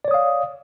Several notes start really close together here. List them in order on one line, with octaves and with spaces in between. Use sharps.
D5 C#5 D#6 F5